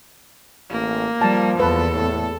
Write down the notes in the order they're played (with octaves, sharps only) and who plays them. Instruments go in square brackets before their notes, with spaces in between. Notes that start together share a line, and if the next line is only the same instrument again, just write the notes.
[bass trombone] A1 [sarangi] A#3
[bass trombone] F3 [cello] G3 [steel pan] A5
[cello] E2 [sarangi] A4 [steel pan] B4
[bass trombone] A2